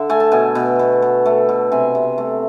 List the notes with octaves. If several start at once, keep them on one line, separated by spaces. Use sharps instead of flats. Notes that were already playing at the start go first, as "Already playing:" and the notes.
Already playing: D3 E5
A3 G#5
A5
B2 G#5
B2
B2
B2
A3
B2
C3 G#5
C3
A3